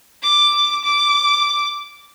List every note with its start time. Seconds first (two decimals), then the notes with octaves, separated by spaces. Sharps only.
0.23 D6
0.84 D6